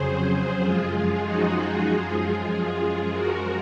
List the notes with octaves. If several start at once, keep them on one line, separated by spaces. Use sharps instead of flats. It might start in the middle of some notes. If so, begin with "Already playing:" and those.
Already playing: F2 C#3 F#3 G#4 C5
F#2 F3 G#3 F4 G#4
D#4 F#4
D#4 F#4
F#2 F3 G#3 F4 G#4
F#2 F3 G#3 F#4 A#4